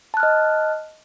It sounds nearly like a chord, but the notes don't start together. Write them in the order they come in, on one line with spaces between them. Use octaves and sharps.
A5 F#6 F6 D#5